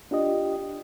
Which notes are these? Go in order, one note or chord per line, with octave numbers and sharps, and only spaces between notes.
D4 F4 G4 D#5